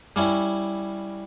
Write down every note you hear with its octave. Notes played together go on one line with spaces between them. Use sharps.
G3 C#4 E4